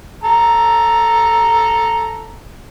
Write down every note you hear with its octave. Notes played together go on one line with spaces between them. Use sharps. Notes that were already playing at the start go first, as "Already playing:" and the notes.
A4 A#5